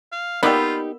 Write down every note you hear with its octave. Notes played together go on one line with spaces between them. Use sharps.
F5
A#3 B3 D#4 F4 G4 D5 B5 E6